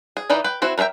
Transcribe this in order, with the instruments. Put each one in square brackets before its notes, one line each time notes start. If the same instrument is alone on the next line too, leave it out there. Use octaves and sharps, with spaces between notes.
[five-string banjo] G#4
E3 D#4 B4 D5
B4 G5
C4 E4 F#4
A#4 B4 C#5 E5 G5